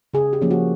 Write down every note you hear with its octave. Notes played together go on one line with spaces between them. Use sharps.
C#3 G#4
G4
F3 A#3 C#4
F#4